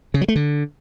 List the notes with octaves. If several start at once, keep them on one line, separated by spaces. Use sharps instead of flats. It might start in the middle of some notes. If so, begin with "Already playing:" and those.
C#3
F#3
A3
D3